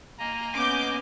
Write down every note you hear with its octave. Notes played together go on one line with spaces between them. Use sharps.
A#3 D#5 G#5 A#5
B3 C#4 D6 G6